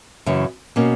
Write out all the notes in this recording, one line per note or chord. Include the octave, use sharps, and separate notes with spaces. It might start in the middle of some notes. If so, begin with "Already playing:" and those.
F#2 C#3 E3
B2 A#3 C#4